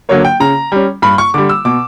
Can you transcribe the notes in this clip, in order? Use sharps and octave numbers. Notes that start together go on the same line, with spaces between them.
D3 F#3 A#3 C#5
G5
C#3 A#5
G3 C#4
G2 B5
C#6
D3 G3 D6
E6
B2 D6